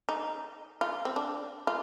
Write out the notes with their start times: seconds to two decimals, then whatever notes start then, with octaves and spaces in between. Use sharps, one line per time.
0.09 D#4
0.81 F4
1.05 C4
1.16 D4
1.67 F4